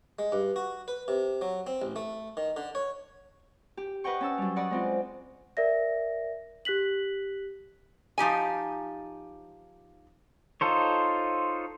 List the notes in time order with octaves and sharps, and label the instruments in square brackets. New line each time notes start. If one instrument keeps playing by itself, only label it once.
[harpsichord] G#3
G2
F#4
B4
C3
F#3
C4
A1
A3
D#3
D3
C#5
[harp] G4
B4 D#5 F#5 G5 C#6
C#4 A5 E6
F#3 G3
D5 D#5 F#5 B5 C#6 D#6
G#3 C4 F4
[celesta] A#4 D5 E5 A#6
G4 F#6 B6 F#7
[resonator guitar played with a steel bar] F3 D#4 G4 G#5
[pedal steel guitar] D#4 F4 A4 C5 C#5